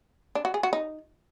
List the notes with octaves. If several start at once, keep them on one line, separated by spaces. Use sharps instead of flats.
D4
F#4
G#4
F#4
D#4